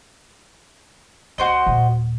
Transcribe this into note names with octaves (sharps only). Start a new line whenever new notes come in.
C#2 F#4 C5 D#5
D#1 A#2